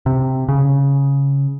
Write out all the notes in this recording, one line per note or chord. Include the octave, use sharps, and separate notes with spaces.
C3
C#3